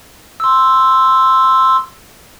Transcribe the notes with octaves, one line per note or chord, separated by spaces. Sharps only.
C6 E6